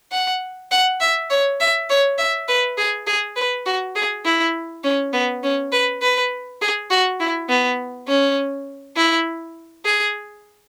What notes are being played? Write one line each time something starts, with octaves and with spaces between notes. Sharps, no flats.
F#5
F#5
E5
C#5
E5
C#5
E5
B4
G#4
G#4
B4
F#4
G#4
E4
C#4
B3
C#4
B4
B4
G#4
F#4
E4
B3
C#4
E4
G#4